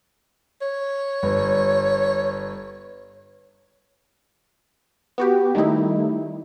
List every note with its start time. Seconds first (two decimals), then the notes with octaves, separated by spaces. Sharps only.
0.61 C#5
1.23 G1
5.18 B3 F#4 G4
5.55 D#3 G3 A3 D#4 E4